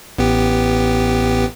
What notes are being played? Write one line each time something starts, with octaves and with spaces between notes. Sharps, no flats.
A1 B3 G4